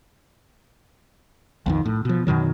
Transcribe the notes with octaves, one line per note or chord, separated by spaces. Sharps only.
B1 F2 D#3
A2
B2 F3
F#2 B2 D#3 F#3